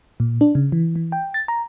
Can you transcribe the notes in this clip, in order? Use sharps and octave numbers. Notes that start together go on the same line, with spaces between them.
A#2
D4
C#3
E3
E3
G5
A6
A#5